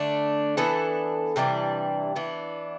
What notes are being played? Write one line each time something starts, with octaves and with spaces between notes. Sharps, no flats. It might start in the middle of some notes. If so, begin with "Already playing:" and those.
Already playing: D3 A3 D4
E3 B3 D4 A4
C3 E3 G3 D4
E3 B3 D4